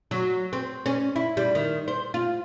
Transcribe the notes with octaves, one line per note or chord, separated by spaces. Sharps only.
F#3
C4
C#4
E4
G3
D#3
C5
F4